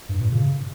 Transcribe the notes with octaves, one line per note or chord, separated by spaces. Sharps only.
G2
A#2
C#3